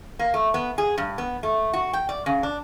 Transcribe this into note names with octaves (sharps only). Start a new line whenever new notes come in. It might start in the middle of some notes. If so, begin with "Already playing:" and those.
A#3
A3
B3
G#4
G2
B3
A3
F#4
G5
D5
C#3
D4